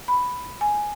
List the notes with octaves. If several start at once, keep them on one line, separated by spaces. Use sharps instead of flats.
B5
G#5